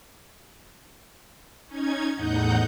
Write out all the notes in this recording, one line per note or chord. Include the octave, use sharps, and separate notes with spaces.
C#4 D#4 G#6
E2 A2 D#4 F#5 G6